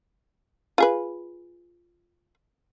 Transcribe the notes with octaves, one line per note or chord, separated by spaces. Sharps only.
F4 G#4 B4